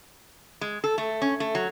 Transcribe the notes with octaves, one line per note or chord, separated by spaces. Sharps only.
G#3
A4
A3
C#4
A3
F#3